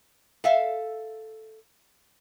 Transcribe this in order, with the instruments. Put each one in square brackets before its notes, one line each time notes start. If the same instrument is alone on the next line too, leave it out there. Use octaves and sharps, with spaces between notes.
[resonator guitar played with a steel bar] A4 E5 F5